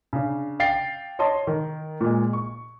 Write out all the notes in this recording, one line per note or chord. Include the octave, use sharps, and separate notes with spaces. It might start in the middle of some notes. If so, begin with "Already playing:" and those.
C#3 D4
F5 G5 A6 C7
C#5 D#5 A5 C6
D#3
A#2 G#3
C#6